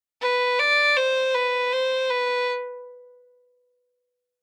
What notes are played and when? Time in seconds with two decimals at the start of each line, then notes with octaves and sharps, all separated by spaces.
0.21 B4
0.59 D5
0.97 C5
1.34 B4
1.73 C5
2.10 B4